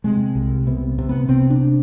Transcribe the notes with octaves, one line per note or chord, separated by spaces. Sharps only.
C3 G#3
C2
C3 B3
C3
B3
C3 C4
D4